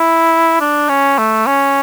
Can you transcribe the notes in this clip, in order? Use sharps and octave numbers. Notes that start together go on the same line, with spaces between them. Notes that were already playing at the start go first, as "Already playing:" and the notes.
Already playing: E4
D4
C#4
A3
C#4